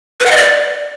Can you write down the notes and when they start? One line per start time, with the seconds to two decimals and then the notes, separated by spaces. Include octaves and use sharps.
0.20 B4
0.26 F#5
0.31 D#5
0.36 D5